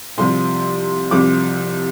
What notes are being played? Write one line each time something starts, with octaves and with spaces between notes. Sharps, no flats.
C2 C3 F3 C6
C2 C3 F3 D6